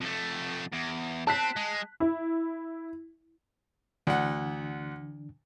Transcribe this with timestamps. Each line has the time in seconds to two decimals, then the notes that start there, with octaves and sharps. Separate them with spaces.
0.01 F2 A3
0.72 E2
1.27 C4 A5 F#6 B6
1.56 G#3
2.00 E4
4.07 D2 D3 E3 D4 F#5